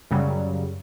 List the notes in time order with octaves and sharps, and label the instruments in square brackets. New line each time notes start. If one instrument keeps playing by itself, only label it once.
[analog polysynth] F#2 C#3 F#3 G3